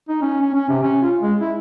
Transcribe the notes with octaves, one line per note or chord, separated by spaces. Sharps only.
D#4
C#4
C#4
C#4
C3
C#4
F4
G#3
E4